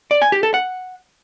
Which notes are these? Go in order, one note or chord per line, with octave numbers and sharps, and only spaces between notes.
D5
G#5
G4
A4
F#5